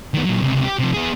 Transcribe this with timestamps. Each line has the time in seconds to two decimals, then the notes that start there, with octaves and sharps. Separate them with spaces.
0.14 D#3 B3
0.25 A#2 F#3
0.42 C#2 C3
0.65 G4
0.79 C3 F3
0.94 B3 G#4